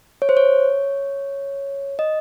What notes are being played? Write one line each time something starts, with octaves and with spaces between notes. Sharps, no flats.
C#5
C5
C#5
D#5